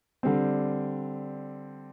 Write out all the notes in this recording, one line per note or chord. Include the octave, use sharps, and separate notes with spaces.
D3 G3 C4